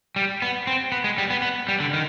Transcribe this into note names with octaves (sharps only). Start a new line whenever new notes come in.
G3
B3
C4
B3
G#3
G3
B3
B3
G3
D3
D#3